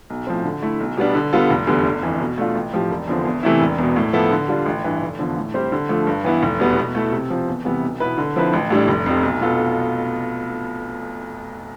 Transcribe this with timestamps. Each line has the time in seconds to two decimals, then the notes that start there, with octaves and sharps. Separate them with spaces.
0.10 B1
0.27 A2 F3 C4
0.44 D3
0.62 A3 E4
0.80 B1
0.97 B2 G3 B3 D4
1.15 D3
1.33 G3 B3 F4 A4
1.50 F1
1.67 E2 D3 G3
1.85 G1
2.03 F2 E3
2.20 B2
2.38 A3 D4 F4
2.55 A1
2.73 A2 F3 C4 G4
2.91 E1
3.08 E2 D3 F3 C4
3.25 E2
3.43 C3 E3 A3 E4
3.61 E1
3.78 E2 B2
3.96 A2
4.13 F3 B3 E4 A4
4.31 D3
4.48 G3 D4 F4
4.66 A1
4.84 G2 E3
5.01 F1
5.19 E2 D3 F3
5.37 A2
5.54 G3 C4 G4 C5
5.72 D3
5.89 F3 A3
6.07 G2
6.24 E3 B3 E4
6.43 F1
6.60 E2 B2 G3 B3
6.77 B2
6.95 A3 E4 A4
7.12 C3
7.30 F3 C4
7.48 E2
7.65 C3 E3 G3 B3
7.82 B1
8.00 B2 B3 E4 B4
8.18 D3
8.36 F3 C4 E4 B4
8.53 A1
8.70 A2 G3 D4 A4
8.88 F1
9.06 F2 C3
9.23 B1
9.41 B2 B3 F4 A4